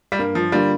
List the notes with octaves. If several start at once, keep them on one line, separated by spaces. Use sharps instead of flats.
G3
G2 A#3
F3
D3 G3 A#3 F4